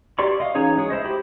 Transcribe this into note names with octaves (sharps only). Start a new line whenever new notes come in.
G4 D5 C6 C#6
D#5 F5
E3 C#4 D#4 G#4 C#5
G#3 G#4 C#5
E4 C5 D#5
G4 B5